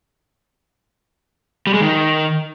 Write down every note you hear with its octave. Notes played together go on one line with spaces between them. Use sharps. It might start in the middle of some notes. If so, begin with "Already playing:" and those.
G3
G#3
D#3